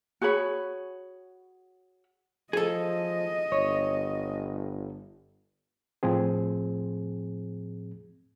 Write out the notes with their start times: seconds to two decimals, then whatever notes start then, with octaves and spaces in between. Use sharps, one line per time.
0.22 F#4 G#4 C#5 B5
2.53 F3 G#4 A4 D#5
3.52 G1 C#5
6.03 A2 F3 C4 G#4